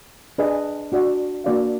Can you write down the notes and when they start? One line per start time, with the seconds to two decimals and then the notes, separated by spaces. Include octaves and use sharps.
0.38 D4 G#4 B4 D#5
0.92 D4 F#4 D5 F#5
1.44 A#3 D4 F#4 D5 F5